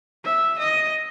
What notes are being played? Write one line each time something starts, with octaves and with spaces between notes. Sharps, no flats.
E5
D#5